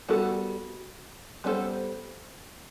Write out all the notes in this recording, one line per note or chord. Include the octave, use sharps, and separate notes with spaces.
G3 B3 F#4 A4
G3 B3 D4 A4 C5